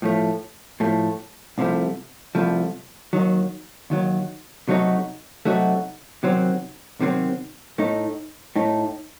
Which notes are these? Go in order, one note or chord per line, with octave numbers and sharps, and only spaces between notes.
A2 F3 A3
A2 F3 A3
C2 C3 F3 A3
C2 C3 F3 A3
D#2 D#3 F#3
D#2 D#3 F#3
C3 F#3 A3 D#4 F#4
C3 F#3 A3 D#4 F#4
C3 D#3 F#3 C4
C3 D#3 F#3 C4
A2 A3 D#4
A2 A3 D#4